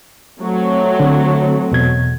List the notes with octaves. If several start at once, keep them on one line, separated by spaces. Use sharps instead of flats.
F#3 A3 C4
D3
E2 B2 G#6